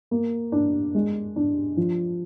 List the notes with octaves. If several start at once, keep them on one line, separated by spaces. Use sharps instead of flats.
A#3
D4
G#3
D4
F3